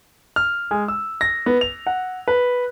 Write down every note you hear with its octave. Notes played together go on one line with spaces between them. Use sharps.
F6
G#3
E6
A#6
B3
F7
F#5
B4